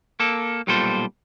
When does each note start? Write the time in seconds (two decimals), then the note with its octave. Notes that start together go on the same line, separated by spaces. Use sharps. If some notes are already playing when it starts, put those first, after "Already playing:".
0.20 A#3 A4
0.67 B1 A#2 G3 F4 A4 C5